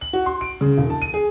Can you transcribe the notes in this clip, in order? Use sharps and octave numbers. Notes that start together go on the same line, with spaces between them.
F#7
F#4
C6
D7
C#3
E1
A5
D#7
G#4